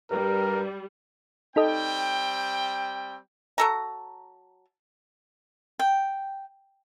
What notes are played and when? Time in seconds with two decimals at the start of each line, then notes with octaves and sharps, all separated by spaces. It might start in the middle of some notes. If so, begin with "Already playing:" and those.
0.11 G2 G3 A#4
1.56 G3 C4 D#4 A4 D#5 G5
3.58 F#3 A4 A#5
5.79 G5